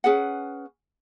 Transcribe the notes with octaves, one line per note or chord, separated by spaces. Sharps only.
C#4 G#4 B4 F#5